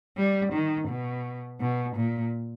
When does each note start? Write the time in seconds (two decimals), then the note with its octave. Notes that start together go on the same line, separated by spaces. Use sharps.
0.17 G3
0.53 D#3
0.89 B2
1.61 B2
1.96 A#2